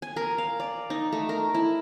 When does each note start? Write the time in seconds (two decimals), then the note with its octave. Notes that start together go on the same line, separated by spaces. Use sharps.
0.02 G#5
0.16 A#4
0.38 F5
0.60 D5
0.90 D#4
1.12 A3
1.29 A#4
1.54 E4